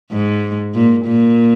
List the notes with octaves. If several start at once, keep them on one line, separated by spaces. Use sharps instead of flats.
G#2
A#2
A#2